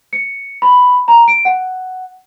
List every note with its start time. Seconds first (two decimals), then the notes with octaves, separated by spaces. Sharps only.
0.13 C#7
0.62 B5
1.08 A#5
1.28 D7
1.45 F#5